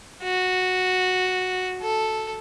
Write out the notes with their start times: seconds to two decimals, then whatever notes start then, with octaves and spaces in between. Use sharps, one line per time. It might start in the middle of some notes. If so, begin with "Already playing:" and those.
0.23 F#4
1.82 A4